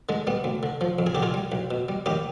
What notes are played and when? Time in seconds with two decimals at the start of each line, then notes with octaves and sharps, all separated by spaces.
0.09 D3 G#3
0.27 G3 B3
0.44 D2
0.63 D3
0.81 F3
0.99 F2
1.07 G#4
1.15 D3 G4
1.22 F4 G#4
1.34 G3
1.52 B1
1.71 B2
1.89 G3
2.06 D#2 D#4 G4